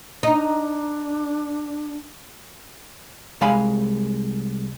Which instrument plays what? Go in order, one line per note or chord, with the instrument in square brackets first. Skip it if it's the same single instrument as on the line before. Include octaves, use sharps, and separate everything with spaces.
[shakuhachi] D4 [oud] D#4
[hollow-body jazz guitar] C2 G#3 F5 G#5 B5